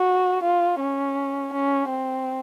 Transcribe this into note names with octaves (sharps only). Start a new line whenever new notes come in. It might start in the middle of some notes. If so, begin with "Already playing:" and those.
Already playing: F#4
F4
C#4
C#4
C4